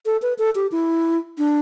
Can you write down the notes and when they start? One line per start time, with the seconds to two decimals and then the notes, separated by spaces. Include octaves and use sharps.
0.06 A4
0.22 B4
0.39 A4
0.55 G4
0.72 E4
1.38 D4